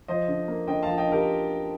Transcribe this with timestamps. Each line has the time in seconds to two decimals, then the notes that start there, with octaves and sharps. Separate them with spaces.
0.08 F3 C5 D#5
0.28 D3
0.48 A#3
0.67 D3 D#5 G5
0.83 F5 A5
0.87 F3
0.98 D#5 G5
1.07 D3 G4 A#4